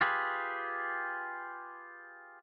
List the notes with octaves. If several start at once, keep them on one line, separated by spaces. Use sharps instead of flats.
F4 G4 G#4 B4